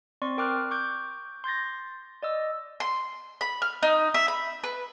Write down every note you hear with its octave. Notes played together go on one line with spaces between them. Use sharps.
C4 D5 C6 C#6
A#4 G5 D6 F6 F#6
C#6 D6 G6
C6 G6 A6 A#6
D5 D#5 E6
C6
B5
F6
D#4
E5
B5
B4